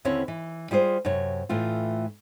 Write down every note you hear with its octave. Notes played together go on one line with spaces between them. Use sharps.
D#2 D3 C4 C#4 E4 C#5
E3
G3 F4 G#4 C5
F#2 C3 C#5
A2 E3 A3 F4